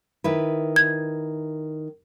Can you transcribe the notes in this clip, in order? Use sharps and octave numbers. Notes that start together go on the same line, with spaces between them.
D#3 E4 B4
G#6